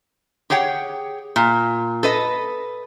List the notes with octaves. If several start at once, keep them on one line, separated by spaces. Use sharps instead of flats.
G4 G#4 C#5 F#5 G5
A#2
A4 B4 D#5